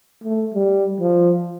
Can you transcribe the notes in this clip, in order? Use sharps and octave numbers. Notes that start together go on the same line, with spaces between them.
A3
G3
F3